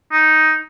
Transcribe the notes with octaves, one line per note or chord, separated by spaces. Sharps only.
D#4